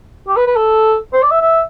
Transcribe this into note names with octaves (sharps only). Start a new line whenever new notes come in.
G4
B4
B4
A4
C5
D5
E5
E5